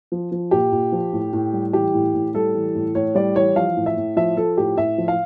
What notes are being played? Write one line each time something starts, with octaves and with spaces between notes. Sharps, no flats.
F3
F3
A#2 G4
A#2
F3
A2
A2
G3
E3 G4
A2
A2
G3 A4
E3
A2
A2 C#5
G3 D5
E3 C#5
F3 F5
A2
E5
A2
F3 E5
F3 A4
A2 G4
A2 E5
F3
F5